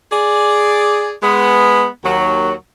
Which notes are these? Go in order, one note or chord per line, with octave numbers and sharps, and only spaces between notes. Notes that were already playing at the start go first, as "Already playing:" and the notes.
G#4 D5
G#3 B3
D#2 F#3